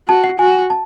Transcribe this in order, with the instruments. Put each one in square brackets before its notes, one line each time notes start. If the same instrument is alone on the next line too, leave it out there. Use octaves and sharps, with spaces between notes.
[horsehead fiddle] F#4 [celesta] A5
[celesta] F#5
[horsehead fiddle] F#4 [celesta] G#5
[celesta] A5